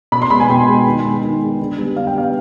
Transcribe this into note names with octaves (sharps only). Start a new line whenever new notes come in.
B2 B5
C6
G#3 B3 B5
G#5
B2 G5
G#3 B3
D#3
G#3 B3
D#3
G#3 B3
D3
G3 B3
D3 F5
G5
G3 B3 F5